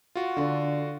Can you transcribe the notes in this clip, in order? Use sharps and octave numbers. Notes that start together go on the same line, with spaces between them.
F4 F#4
D3 D5